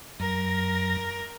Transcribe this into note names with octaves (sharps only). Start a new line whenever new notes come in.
F#2 A#4 A#6